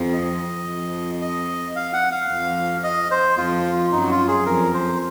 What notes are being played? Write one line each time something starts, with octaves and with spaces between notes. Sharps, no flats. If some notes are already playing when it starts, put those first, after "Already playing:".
Already playing: F2 F3
D#5
F2 F3
D#5
F5
F#5
F5
F2 F3
D#5
C5
F2 F3 F4
F#2 F#3 D#4
F#4
F4
G#4
F2 F3 A#4
C5